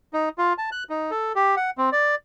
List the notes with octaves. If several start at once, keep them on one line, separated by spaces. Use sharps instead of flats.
D#4
F4
A5
F#6
D#4
A4
G4
F#5
C4
D5